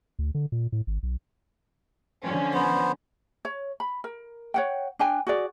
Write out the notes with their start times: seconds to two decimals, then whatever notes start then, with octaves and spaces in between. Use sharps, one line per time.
0.19 D2
0.35 D3
0.52 A#2
0.72 A2
0.87 G#1
1.03 B1
2.21 D3 F3 C#4
2.54 B3 C5
3.45 C#5
3.80 B5
4.04 A#4
4.54 C#5 F#5 G5
4.99 D4 G5 G#5
5.27 F#4 G#4 D5